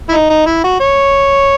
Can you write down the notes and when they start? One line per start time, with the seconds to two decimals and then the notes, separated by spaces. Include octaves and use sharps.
0.09 E4
0.12 D#4
0.30 D#4
0.46 E4
0.64 F#4
0.80 C#5